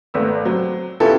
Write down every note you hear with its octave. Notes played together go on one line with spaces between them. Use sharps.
G#1 A3 B3 E6
F#3 C4
B3 C#4 E4 F4 G4 A4